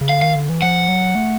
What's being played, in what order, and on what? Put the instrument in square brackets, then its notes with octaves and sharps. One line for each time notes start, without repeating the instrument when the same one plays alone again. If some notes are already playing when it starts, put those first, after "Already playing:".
[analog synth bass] C#3
[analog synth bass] D3 [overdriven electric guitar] F5
[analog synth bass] D#3 [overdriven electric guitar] F5
[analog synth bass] D3
E3
[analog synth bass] F3 [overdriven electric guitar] F#5
[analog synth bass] F#3
A3